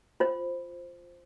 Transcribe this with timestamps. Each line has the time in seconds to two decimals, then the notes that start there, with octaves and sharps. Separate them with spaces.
0.20 F4 C5